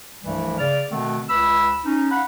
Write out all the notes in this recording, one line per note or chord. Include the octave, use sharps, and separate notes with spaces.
C2 G2 E3 F3 G3 A3
C#3 D5 F6
B2 D3 D#3 A3 C4
C#2 B4 B5 E6
C#4 D#4
F5 F#5 B5